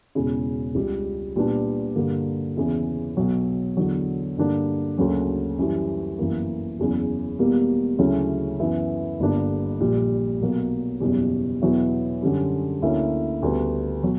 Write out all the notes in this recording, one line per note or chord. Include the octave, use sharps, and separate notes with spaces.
E1 E2 C#3
C#2 C#3 G3
A#2 G3 B3 D4
G2 D3 G3 A#3
E2 C#3 E3
B1 B2 F#3
E2 D3 F#3
G2 D3 A#3 D4
D2 C#3 F#3 A#3 C#4
F#2 E3 G3
G1 F#2 E3 A#3
F#1 E2 C#3
E1 E2 B2 G3 A#3
D2 C#3 F#3 C#4 E4
F#2 E3 B3 E4
G1 G2 D3 A#3 D4
A#1 A#2 G3
B1 B2 F#3 A#3
F#1 E2 B2 G3
E2 B2 F#3 B3 E4
F#2 D3 G3 C#4
D2 D3 A#3 C#4 E4
D2 C#3 G3 B3
B2 F#3